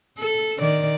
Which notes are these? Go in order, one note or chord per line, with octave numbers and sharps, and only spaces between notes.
A4
D#3 D5